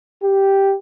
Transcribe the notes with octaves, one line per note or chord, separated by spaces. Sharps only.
G4